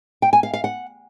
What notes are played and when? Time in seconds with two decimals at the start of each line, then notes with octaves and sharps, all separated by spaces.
0.22 G5
0.33 G#5
0.43 F5
0.54 F5
0.64 F#5